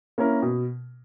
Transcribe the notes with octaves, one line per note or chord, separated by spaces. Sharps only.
A#3 C#4 E4 A#4
B2